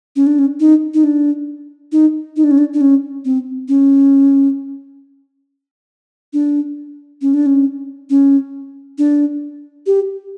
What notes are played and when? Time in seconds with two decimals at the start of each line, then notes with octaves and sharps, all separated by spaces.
0.16 C#4
0.27 D4
0.39 C#4
0.60 D#4
0.94 D#4
1.04 D4
1.92 D#4
2.37 D#4
2.44 D4
2.51 C#4
2.58 D4
2.74 D4
2.81 C#4
3.25 C4
3.68 C#4
6.33 D4
7.22 C#4
7.34 D4
7.46 C#4
8.10 C#4
8.98 D4
9.86 G4